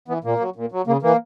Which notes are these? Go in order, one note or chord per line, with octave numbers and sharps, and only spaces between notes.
E3 B3
A#2 A#3
F#3
A#2
F#3
C#3 A#3
E3 A#3